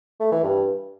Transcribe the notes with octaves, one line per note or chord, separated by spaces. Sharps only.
A3
E3
G2